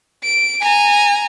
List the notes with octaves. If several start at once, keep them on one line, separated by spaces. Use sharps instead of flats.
D7
G#5 A#5